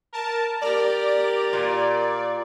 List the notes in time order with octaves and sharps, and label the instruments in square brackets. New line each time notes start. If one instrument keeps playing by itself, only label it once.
[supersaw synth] A#4 A5
[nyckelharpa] G4 A#4 [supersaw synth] D5
[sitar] A#2